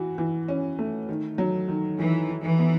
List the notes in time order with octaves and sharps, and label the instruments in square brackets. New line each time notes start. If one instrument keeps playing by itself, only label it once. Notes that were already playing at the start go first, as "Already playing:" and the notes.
Already playing: [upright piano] E3 F#4
E3
C#4
A3
D#3
F#3
D#3
[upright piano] D#3 [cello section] E3
[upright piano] D#3
[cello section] E3
[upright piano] B3